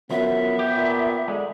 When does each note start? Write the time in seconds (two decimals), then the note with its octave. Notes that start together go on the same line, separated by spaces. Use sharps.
0.10 F#2 F3 B3 E5
0.59 G4
0.77 A#2
1.28 D3 G#3